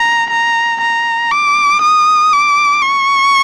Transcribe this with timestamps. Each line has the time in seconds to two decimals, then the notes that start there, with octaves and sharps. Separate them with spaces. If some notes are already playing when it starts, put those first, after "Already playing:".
Already playing: A#5
0.30 A#5
0.81 A#5
1.32 D6
1.82 D#6
2.33 D6
2.82 C#6